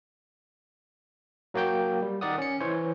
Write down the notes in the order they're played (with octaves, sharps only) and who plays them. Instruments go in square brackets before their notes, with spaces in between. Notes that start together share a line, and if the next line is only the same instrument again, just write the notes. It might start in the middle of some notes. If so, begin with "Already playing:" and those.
[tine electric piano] F#3 A#3 F#4 G5 G6
G3
D#3 A#4 D5 F#5 D#6
C#4 C#7
E3 C5 C#5